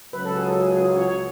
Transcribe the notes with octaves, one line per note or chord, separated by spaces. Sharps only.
C#2 C#3 F#3 B4
A4
G#4
A4
G#4
G#4
F4
C#5
C#5